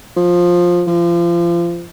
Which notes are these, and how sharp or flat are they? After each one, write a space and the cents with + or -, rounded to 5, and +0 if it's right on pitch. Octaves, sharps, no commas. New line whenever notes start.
F3 +10
F3 -30